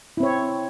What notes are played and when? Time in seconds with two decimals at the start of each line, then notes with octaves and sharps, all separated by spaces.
0.17 E4
0.20 C4
0.23 C#5